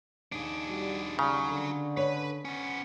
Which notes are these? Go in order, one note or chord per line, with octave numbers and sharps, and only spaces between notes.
D#2 D4 G#4
G3 F#4
C#3 G3 F#4 A#5
D3
B4 C#5
B3 C#4